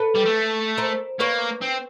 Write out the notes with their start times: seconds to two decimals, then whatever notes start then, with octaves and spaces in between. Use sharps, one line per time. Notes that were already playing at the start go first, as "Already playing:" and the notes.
Already playing: A4 B4
0.15 G3
0.25 A3
0.78 A#4 C5
1.20 A#3 B4 C#5
1.62 C4